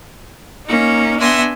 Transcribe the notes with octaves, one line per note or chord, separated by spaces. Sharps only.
A#3 C#4 D#4
B3 D4 E5 G#5 C6 A#6